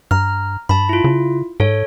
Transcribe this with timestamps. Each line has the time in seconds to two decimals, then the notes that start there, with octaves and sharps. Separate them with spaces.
0.11 G2 A#5 F6
0.69 G2 A5 B5
0.89 E4 F4
1.04 C#3
1.60 G#2 A4 C#5